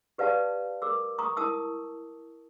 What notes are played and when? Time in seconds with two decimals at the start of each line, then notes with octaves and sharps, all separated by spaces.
0.18 G4 B4 D5 F5 A5
0.82 A#4 D6 E6
1.19 A#5 C#6 D#6
1.37 E4 A#4 A5 D#6 E6